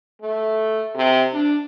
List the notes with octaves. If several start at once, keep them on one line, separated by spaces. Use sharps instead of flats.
A3
C3
D4